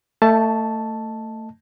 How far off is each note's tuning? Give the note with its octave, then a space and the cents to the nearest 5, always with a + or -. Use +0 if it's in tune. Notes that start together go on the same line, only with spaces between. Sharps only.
A3 +25 D#5 +0 A5 +0